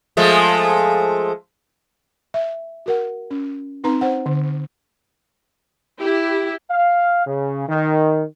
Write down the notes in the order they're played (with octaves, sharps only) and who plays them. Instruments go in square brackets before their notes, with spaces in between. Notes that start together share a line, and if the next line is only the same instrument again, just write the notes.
[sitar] F3 G#3 A3
[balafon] E5
F#4 A#4 F#5
C#4
C4 D#4 B4 A#5
C5 F#5
D3
[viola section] E4 G4
[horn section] F5
C#3
D#3